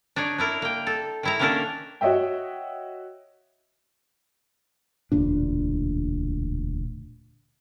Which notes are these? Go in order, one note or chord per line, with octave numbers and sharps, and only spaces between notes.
D4 D#4 C#5 D5
D4 E4 A#4
A#3 G5
A4
D#3 E4 A#5
D#3 A#3 C#4 D4 A4 A#4
F#4 C#5 D#5 E5 G5
E1 D2 A#2 D4